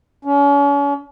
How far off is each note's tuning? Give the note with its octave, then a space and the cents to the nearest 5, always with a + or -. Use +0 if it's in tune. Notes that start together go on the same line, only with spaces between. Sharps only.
C#4 +40